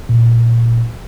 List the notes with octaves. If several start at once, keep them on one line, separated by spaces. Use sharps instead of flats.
A#2